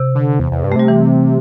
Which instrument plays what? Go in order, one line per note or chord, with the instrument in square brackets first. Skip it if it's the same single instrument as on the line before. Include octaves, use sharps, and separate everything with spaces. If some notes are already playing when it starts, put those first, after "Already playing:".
Already playing: [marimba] C3
[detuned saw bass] D3
E2
E2
G2
[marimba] A3
[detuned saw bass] C3 [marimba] G3
[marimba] E3